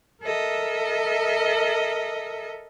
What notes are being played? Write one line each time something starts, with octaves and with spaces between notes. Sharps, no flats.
A4 A#4 D#5 E5